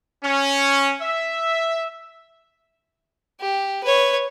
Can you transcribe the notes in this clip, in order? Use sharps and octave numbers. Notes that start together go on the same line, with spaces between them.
C#4
E5
G4
B4 C#5